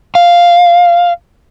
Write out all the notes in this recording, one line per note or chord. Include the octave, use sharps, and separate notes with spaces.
F5